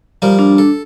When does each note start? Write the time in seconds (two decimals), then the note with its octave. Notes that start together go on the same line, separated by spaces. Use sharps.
0.22 F3 G3 A#4
0.39 D4
0.58 A4